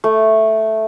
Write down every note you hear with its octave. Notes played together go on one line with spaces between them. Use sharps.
A3